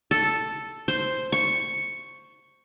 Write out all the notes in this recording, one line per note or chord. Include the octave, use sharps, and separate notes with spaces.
A4
C5
C#6